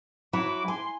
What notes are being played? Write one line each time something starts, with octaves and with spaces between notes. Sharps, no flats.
F#3 E4 F#4 D6
G#5 C6